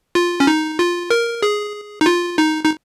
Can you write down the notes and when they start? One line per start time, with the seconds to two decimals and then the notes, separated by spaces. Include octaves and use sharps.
0.15 F4
0.40 C#4
0.47 D#4
0.79 F4
1.10 A#4
1.42 G#4
2.01 D#4
2.06 F4
2.38 D#4
2.64 D#4